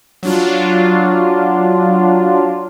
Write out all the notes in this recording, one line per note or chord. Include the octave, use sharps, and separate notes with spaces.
F#3 D4 F4